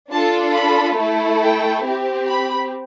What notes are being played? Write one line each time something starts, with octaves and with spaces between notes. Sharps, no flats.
D4 F4 A4 A5
B5
A3 E4 A4
G5
C4 G4
B5